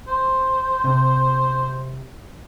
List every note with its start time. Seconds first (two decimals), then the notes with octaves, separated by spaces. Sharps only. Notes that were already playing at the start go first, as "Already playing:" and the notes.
0.08 C5
0.84 C3